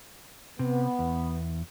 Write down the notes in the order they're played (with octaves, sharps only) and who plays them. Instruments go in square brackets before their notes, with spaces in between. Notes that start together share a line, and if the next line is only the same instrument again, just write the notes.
[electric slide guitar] C3 [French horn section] B3
[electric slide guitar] E2